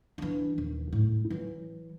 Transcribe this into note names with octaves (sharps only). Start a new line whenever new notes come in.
E3 D4
D#1
A2
E3 F#3